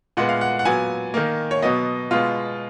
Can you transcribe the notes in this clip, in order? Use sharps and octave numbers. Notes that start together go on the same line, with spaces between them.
A#2 G#3 B3 F#5
F5
F#5
F#5
A#2 F#3 B3 G#5
D#3 A#3
C#5
B2 F#3 B3 D#5
B2 G#3 B3 F4